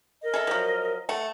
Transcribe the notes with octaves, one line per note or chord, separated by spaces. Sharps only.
A#4 D#5
G#4 A4 E5
F3 F#3
A3 F#5